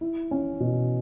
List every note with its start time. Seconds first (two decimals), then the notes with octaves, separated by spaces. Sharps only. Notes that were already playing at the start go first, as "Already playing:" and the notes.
0.01 E4
0.31 C#4
0.60 B2